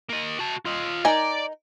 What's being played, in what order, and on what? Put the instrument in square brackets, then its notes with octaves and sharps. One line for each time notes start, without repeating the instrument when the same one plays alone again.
[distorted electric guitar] A#3 D#5
F#4 A5
F4 D#5
[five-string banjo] D#4 A#4 G#5 [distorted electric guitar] D5